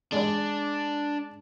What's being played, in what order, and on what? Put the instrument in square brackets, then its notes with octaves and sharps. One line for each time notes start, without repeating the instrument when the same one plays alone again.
[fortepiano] G#3 D5 [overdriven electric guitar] D4